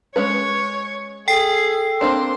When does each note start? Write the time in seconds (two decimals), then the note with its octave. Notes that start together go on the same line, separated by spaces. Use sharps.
0.16 G#3 C#4 B4 C#5
1.28 G#4 A4 G5 C7
2.01 A#3 C4 D4 C6